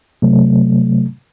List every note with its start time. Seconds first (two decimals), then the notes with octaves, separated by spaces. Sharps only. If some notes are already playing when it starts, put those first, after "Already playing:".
0.22 C3 F#3 A3